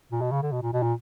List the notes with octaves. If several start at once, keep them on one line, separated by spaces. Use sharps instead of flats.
A#2
B2
C#3
D3
B2
A#2
B2
A#2